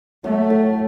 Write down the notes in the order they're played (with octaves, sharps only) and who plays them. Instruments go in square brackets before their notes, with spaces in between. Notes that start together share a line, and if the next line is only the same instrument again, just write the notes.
[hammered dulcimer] F#3 [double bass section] A3
[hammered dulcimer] A2